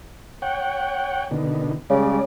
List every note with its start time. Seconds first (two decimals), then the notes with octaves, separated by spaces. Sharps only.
0.42 C#5 F#5 G5
1.31 B2 D3 D#3
1.90 C#3 G3 G#3 D5